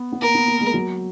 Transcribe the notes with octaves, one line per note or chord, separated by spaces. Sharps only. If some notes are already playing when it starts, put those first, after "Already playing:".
Already playing: B3
B3
A#3 A#4
B3
A#3
G#3
F#3